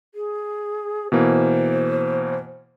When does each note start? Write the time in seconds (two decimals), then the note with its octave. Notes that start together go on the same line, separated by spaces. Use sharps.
0.15 G#4
1.12 B2 E3 A#3 C5